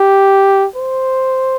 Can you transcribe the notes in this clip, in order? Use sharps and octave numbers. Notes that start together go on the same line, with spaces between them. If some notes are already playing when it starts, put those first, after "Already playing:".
Already playing: G4
C5